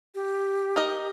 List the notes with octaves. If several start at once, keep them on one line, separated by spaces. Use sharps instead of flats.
G4
D#4 A#4 D#5